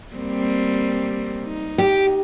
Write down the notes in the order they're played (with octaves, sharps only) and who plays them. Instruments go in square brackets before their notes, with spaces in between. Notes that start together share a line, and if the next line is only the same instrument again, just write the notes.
[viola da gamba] G3 A#3 C4
D#4
[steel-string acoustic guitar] G4